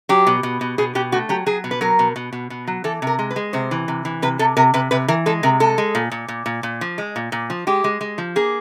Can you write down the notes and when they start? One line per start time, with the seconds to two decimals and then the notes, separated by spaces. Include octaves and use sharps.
0.09 F#3 G4
0.27 B2
0.43 B2
0.61 B2
0.78 B2 G#4
0.95 B2 G4
1.12 A3 F#4
1.29 F#3 G4
1.46 F#3 G#4
1.64 B2
1.71 B4
1.81 F#3 A#4
1.99 B2
2.16 B2
2.33 B2
2.50 B2
2.67 F#3
2.84 E3 A4
3.02 C3 A#4
3.19 G#3
3.31 B4
3.36 G#3
3.53 C3 C5
3.71 E3
3.88 C3
4.05 E3
4.22 C3 B4
4.39 C3 A4
4.57 C3 A#4
4.74 C3 B4
4.91 C3 B4
5.08 E3 A#4
5.26 G#3 A4
5.43 C3 A#4
5.60 G#3 A4
5.78 G#3
5.95 A#2
6.12 A#2
6.28 A#2
6.46 A#2
6.63 A#2
6.81 F3
6.98 G#3
7.16 A#2
7.32 A#2
7.50 F3
7.67 G#3 G4
7.84 G#3
8.01 G#3
8.18 F3
8.36 A#3 G#4